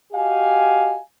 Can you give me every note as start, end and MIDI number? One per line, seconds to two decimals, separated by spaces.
0.13 0.98 66
0.13 0.98 67
0.13 0.98 75
0.13 0.98 77
0.13 0.98 80